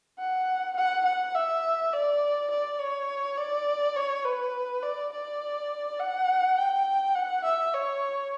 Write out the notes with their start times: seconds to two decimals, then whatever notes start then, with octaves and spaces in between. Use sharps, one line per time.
0.19 F#5
0.77 F#5
1.05 F#5
1.35 E5
1.93 D5
2.51 D5
2.80 C#5
3.38 D5
3.96 C#5
4.25 B4
4.83 D5
5.12 D5
5.99 F#5
6.58 G5
7.15 F#5
7.45 E5
7.74 C#5